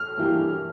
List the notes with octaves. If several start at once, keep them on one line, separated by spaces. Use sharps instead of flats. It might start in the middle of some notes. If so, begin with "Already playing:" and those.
Already playing: F6
G2 E3 A#3 E4 G4